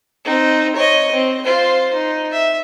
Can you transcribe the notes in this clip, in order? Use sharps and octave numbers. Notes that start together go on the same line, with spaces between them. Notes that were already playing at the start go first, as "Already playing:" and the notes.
C4 D#4
C#5 D#5
C4
F4 C5
D#4
E5